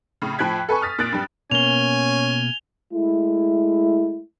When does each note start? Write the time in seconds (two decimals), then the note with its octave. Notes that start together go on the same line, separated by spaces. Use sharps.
0.22 A2 C#3
0.38 A2 F3 G5 F#6 G#6 B6
0.69 A4 B4 G#5 C#6
0.81 D#6 F6 A6 B6
0.99 A#2 F#6 A6 D7
1.12 G2 G3
1.51 B2 A#3 C#4 G#5 F7 G7
2.93 G#3 A3 E4